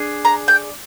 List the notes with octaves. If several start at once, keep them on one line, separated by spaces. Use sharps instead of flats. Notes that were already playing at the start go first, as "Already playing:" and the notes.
Already playing: D4 G#4
A#5
G5